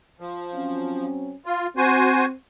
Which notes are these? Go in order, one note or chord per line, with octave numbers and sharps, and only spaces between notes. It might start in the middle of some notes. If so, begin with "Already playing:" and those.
F3
F#3 C4 C#4
F4
C4 F#4 C5 G#5